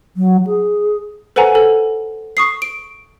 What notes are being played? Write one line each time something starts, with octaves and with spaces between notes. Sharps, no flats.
F#3
G#4
A4 B4 C5 F#5 G#5 A#5
A4
C#6 D#6 C7
D7